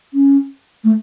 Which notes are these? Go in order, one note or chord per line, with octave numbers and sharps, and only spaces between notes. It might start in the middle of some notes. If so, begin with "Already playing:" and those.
C#4
A3